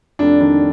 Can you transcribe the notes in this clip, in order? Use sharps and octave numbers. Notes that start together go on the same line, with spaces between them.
F1 D4
D#3 D4